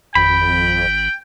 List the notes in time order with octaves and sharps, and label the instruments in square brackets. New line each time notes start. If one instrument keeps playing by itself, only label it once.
[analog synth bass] G#1 [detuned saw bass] F2 [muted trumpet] G5 [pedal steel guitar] B5